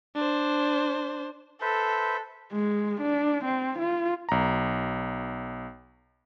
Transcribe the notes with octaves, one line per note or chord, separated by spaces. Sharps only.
D4 C5
A4 B4 C5 E5
G#3
D4
C4
F4
B1 A#5